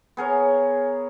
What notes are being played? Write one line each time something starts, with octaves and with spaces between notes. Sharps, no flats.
B3 G#4 A#4 C#5